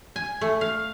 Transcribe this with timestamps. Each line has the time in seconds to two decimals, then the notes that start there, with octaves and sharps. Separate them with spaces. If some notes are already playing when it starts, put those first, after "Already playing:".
0.16 G#5
0.41 A3
0.61 F5